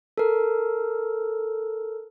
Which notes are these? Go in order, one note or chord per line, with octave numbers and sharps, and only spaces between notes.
A4 A#4